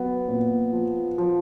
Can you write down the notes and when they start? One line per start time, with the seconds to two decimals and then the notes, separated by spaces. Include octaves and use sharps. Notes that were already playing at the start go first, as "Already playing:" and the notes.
Already playing: F#3 B3
0.28 A#2
0.73 F3
1.18 F3